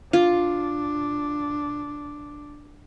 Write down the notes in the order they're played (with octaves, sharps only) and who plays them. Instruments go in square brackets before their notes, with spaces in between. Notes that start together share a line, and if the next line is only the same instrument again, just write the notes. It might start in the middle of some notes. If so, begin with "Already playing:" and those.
[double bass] D4 [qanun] F4